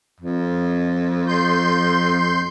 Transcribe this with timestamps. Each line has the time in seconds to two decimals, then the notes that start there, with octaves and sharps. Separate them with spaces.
0.20 F2
1.28 C6 G6